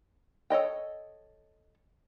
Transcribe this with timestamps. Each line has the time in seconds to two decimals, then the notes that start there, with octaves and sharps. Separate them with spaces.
0.50 A4 C#5 D#5 G5